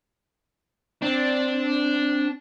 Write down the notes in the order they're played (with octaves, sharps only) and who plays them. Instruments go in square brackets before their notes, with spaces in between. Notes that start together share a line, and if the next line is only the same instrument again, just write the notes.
[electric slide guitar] C4 [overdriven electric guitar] D4